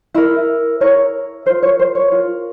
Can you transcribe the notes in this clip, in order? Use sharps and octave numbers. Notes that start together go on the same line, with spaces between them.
E4 A#4 E5
E4 A#4 C#5
F4 A#4 C5
C#5
C5
C#5
F4 A#4